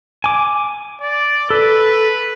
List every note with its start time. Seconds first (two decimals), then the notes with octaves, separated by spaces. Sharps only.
0.24 G#5 D6
1.01 D5
1.50 A4 B4